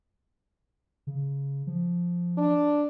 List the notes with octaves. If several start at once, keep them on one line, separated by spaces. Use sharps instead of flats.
C#3
F3
D4